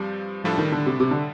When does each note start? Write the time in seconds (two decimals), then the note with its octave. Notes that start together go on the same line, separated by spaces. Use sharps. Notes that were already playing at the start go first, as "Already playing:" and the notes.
Already playing: G2 F3 G3 C4
0.44 A2 F3 G3 D4 A4
0.58 D#3
0.72 D3
0.86 C3
1.00 C3
1.11 D3